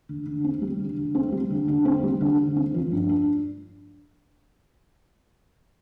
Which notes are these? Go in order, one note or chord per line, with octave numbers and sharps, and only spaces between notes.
D3
D3
C4
G3
D3
D3
C4
G3
D3
D3
C4
G3
D3
D3
C4
F3
G2
D4